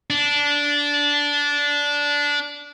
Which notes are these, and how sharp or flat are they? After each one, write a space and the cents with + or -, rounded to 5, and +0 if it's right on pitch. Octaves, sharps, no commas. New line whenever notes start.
D4 -15